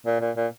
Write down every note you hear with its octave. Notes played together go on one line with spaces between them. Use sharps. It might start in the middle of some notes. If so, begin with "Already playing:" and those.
A#2
A#2
A#2